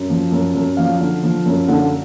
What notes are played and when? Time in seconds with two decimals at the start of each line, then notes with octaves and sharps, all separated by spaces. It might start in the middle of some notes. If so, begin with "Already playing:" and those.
Already playing: F#2
0.10 F3
0.32 F#2
0.55 F#2
0.77 F3 F5
1.00 D3
1.23 F3
1.46 F#2
1.68 D3